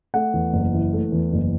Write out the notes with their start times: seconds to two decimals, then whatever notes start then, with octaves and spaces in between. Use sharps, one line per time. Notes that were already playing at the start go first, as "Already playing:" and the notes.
0.14 A3 F#5
0.33 E2
0.53 F#1
0.73 E3
0.93 A3
1.12 E2
1.32 F#1